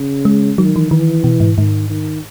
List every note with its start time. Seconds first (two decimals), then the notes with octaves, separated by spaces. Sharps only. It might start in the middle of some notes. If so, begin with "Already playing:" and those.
Already playing: C#3
0.25 G#3
0.58 D#3 F#3
0.76 E3
0.91 D#3 E3
1.24 B2
1.40 G#2
1.57 G#2 D#3
1.90 D#3